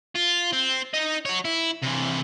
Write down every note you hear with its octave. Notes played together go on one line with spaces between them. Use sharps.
F4
C4
D#4 D#5
F#4 C#5
E4
C3 E3